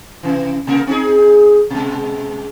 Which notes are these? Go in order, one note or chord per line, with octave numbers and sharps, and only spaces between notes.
C3 E3
C3 A#3 A#4
C4 D#4 G#4
B2 G#3